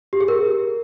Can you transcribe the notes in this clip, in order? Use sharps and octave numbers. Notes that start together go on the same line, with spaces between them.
G4
G#4
A#4